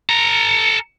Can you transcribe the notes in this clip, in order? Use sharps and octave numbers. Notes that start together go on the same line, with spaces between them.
A4 A#5